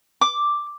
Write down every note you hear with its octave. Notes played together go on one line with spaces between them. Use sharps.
D6